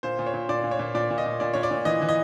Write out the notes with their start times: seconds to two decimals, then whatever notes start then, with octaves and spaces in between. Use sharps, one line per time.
0.03 A#2 C5
0.19 A#2
0.26 C#5
0.34 A#2
0.49 A#2 D5
0.63 A#2
0.71 C#5
0.79 A#2
0.94 A#2 D5
1.10 A#2
1.18 D#5
1.26 A#2
1.40 A#2 D5
1.54 A#2 C#5
1.63 D5
1.71 A#2
1.85 E3 D#5
2.01 E3
2.09 D#5